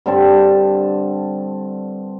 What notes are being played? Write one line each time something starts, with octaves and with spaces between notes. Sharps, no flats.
G2 D3 C4 A5